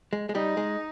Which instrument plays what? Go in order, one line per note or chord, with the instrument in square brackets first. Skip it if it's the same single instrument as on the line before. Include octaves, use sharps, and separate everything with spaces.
[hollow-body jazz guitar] G#3
G#3
[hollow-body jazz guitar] G3 [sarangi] D#4
[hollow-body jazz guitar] G#3